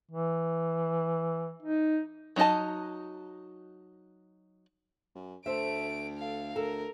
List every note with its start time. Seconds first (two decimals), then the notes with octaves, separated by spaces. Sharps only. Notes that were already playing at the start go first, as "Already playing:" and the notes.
0.11 E3
1.62 D#4
2.36 F#3 D#4 E4 D#5 A5
5.15 F#2
5.46 D2 A3 C5 E5 D7
6.18 A4 F5
6.56 D2 A4 A#4